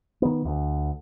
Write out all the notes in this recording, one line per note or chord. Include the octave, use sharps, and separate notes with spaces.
D#3 B3
D2